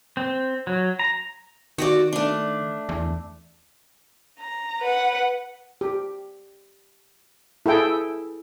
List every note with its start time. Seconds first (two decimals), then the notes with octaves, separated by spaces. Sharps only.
0.17 C4
0.67 F#3
0.99 A#5
1.78 D#3 F#4 G4 D5
2.13 A3 D4
2.89 E2
4.39 A#5
4.81 B4 F#5
5.81 G4
7.66 E4 G#4 A4 G5